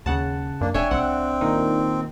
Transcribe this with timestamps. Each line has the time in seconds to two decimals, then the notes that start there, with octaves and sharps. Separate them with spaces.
0.06 D#2 C#3 F#5 A5
0.61 F#2 A#3 D4
0.74 F1 D4 C#5 E5 G5 G#5
0.91 C2 C4 F#5
1.41 A#2 D#3 D#4